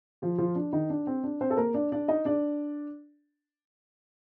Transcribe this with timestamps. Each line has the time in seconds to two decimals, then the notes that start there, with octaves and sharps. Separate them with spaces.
0.22 F3 F4
0.38 F3 F4
0.55 D4
0.73 D#3 D#4
0.90 D4
1.07 C4
1.24 D4
1.41 C4 C5
1.50 A4
1.57 A#3 A#4
1.74 D4 D5
1.92 D4 D5
2.08 D#4 D#5
2.25 D4 D5